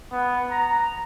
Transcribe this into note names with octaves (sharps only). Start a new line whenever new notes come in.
B3
A#5